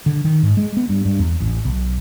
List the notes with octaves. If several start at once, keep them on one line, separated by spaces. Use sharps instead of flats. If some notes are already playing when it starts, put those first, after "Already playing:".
D3
D#3
G#2
G#3
B3
G2
G2
E2
A1
B1